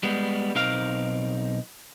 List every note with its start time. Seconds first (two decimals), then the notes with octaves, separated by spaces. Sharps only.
0.03 G3 G#3 B3
0.55 B1 C4 D#4 A#4 F5